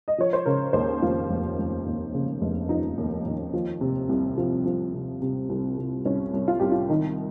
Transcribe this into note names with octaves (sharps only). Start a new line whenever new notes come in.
D#5
F3 C#5
C5
C#3 A#4
D#2 C5
F1 F4
F1
F1
D#2
C#3
F1
F3 D#4
D#2
D#2
F3
C3
C2
F3
F3
C3
C3
C2
C3
C2 C#4
C2
F4
C2 G4
F4
D#3 D#4